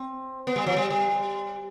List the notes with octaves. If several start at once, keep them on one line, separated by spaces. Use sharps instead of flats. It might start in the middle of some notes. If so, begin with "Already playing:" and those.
Already playing: C4
B3
G3
F3
G3
G3